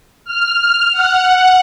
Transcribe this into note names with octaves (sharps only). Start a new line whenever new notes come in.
F6
F#5